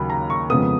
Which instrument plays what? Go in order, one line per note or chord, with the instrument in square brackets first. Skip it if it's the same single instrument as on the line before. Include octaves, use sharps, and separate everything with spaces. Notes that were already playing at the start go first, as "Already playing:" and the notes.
Already playing: [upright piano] D#2 C#3 F#3 B5
A#5
C#6
F2 C#3 G#3 B3 D#6